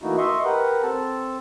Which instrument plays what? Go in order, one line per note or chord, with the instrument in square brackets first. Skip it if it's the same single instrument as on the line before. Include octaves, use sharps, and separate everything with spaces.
[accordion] E3 A3 A#3 D#4 E4 F#4
D#5 E5 C6 C#6
G4 A#4 B4 F#5
C4 A4 A5